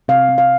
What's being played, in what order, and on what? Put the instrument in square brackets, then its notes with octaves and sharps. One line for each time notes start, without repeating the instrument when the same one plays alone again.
[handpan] C3 F5
C4
F5